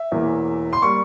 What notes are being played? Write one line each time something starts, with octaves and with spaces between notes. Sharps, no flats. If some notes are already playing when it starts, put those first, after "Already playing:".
Already playing: E5
E1 E2 E3 A#3
C6
G3 A#3 C#6